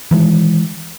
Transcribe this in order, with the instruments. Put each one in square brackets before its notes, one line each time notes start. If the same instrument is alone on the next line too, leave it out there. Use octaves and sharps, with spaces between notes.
[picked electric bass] D#3 E3 G#3